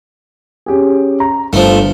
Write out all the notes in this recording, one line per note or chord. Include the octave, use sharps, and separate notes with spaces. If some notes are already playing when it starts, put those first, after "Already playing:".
C#4 G4 G#4
A#5
G1 F3 A3